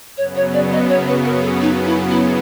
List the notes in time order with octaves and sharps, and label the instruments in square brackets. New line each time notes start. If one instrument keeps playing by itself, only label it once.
[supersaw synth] F#2 C#3 F#3 B3 [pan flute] C#5
[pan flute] C#5
D5
D#5
C#5
B4
A#4
A4
D#4
E4
E4